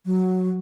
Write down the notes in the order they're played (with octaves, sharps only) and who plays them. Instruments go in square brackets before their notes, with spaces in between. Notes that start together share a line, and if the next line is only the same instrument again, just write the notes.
[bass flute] F#3